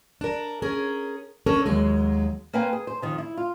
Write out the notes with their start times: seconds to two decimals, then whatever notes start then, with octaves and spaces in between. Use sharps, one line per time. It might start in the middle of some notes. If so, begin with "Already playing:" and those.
0.21 D4 A#4
0.62 C#4 G#4 A#4
1.46 C#4 D4 A4 A#4 C#5
1.66 D#2 F#3 G#3
2.53 A#3 C4 B4 F5 G5 G#5
2.73 G#4
2.87 C5
3.02 F2 D#3 F3
3.18 E4
3.37 F4